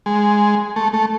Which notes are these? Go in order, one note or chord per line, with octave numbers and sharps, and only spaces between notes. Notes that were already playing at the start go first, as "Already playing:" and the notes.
G#3
A3
A3